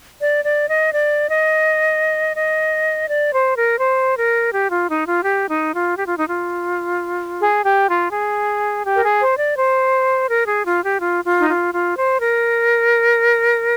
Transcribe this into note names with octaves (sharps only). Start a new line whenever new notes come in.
D5
D5
D#5
D5
D#5
D#5
D5
C5
A#4
C5
A#4
G4
F4
D#4
F4
G4
D#4
F4
G4
F4
D#4
F4
G#4
G4
F4
G#4
G4
A#4
G#4
C5
D5
C5
A#4
G#4
F4
G4
F4
F4
D#4
F4
F4
C5
A#4